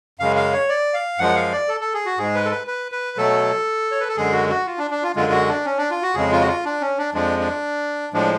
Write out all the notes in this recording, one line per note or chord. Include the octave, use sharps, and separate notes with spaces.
F#2 C#3 G#3 F5
F5
C#5
D5
F5
F#2 F3 G#3 F#5
F5
D5
A4
A4
G#4
F#4
G#2 G#3 G#4
B4
A4
B4
B4
B4
B2 F#3 A3 A4
C#5
B4
A4
F#2 D3 G#3 G#4
F#4
F#4
F4
D4
D4
F4
F#2 D3 G#3 F4
F#4
D4
C#4
D4
F4
F#4
F2 C#3 G#3 G#4
F4
F#4
F4
D4
C#4
D4
F2 F3 G#3 D4
D4
A2 F3 G#3 D4